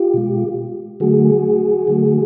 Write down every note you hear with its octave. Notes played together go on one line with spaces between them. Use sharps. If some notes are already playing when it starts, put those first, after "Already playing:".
Already playing: F4 G4
B2 G#3
D3 F#3 A3 F#4 G#4
D3 F#3 A3